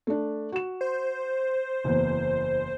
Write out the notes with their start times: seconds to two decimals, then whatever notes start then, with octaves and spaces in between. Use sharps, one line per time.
0.07 A3 D4
0.52 F#4 E7
0.81 C5
1.84 F#1 E2